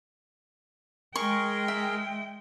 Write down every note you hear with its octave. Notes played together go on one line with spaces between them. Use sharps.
G#3 G#4 A#4 G5 C#6
E5